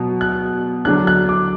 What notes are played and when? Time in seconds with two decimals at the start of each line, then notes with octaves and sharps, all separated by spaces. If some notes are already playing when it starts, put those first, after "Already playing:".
Already playing: B2 F#3 B3
0.21 F#6
0.85 D3 F#3 D4 F#6
1.07 F#6
1.29 D6